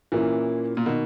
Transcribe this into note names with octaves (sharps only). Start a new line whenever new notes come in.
A#2 E3 A#3 C#4 E4
A#2
B2 D#3 A#3